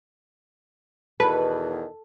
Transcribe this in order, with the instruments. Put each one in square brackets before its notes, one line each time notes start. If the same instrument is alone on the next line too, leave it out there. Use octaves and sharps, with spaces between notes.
[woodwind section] E2 B2 D#3 [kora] A4 [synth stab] B4